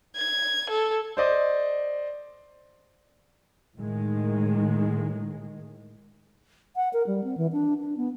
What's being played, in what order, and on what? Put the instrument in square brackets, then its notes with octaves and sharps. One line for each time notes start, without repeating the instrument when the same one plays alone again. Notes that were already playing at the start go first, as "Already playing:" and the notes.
[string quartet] G#6
A4
[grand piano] C5 D5 D#5
[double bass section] A2 D#3 G#3
[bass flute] F#5
A#4
G3
C4
E3
D4
D4
B3